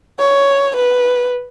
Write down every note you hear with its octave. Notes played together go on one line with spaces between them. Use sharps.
C#5
B4